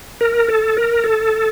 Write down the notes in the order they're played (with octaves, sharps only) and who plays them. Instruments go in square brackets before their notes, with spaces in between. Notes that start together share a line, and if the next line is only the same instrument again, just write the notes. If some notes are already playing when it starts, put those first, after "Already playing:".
[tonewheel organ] A#4
A4
A#4
A4